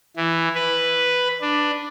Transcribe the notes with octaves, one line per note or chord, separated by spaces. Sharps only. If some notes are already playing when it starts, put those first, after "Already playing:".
E3
B4
D4